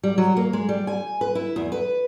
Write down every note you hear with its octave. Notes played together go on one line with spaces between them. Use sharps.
G3
F#3
A#3
G#3
G3
G#5
B4
E4
E2
B4